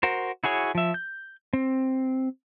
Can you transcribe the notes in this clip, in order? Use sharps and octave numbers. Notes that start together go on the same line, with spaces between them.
F#4 A#4 C5
E4 F#4 G#4 C#5
F3 E5
G6
C4